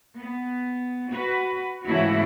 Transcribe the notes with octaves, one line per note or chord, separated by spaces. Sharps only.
B3
F#4 B4
G#2 C#3 E3 A3 E4 F#4